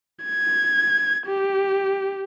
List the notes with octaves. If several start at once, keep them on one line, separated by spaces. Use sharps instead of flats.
G#6
G4